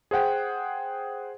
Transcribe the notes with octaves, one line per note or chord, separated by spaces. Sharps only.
G#4 C5 F#5 G5